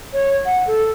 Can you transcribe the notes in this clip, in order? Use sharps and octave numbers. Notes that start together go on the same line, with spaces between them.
C#5
F#5
A4